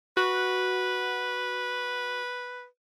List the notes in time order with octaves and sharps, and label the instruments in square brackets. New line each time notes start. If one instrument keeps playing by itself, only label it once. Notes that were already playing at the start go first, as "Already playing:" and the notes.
[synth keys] F#4 [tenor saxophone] B4